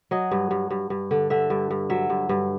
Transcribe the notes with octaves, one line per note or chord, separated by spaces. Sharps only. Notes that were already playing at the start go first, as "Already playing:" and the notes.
F#3 D#5
G2
G2
G2
G2
D3
D3 E5
G2
G2
F#3 E5
G2
G2